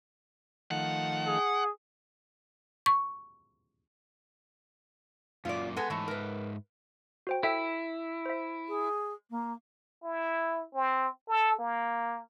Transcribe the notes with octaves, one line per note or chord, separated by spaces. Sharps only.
D#3 F3 A3 F#5
G#4
C#6
F#2 A#2 F4 D5
G#3 B3 A4
G#2 E3 A3 E5
A#4 B4
F#4 C5 G5
E4 A4 E5 G5
C5 E5
G#4
A#3
E4
C4
A4
A#3